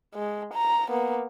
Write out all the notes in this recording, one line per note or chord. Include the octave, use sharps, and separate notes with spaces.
G#3
A#5
A#3 B3